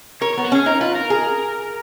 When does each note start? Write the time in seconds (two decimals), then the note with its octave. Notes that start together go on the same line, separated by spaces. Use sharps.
0.22 A#4 C#5
0.33 B3 C#5
0.44 F#4
0.52 C#4 G#4
0.66 D#4 A#4
0.81 F4 B4
0.95 A#4
1.10 G#4